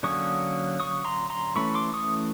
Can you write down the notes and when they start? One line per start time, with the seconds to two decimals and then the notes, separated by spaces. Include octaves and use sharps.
0.03 D3 F#3 A#3 C#4 C#6 D#6
0.80 C#6 D#6
1.05 A#5 C6
1.30 A#5 C6
1.56 E3 A3 C#4 B5 C#6
1.74 C6 D6
1.93 C#6 D#6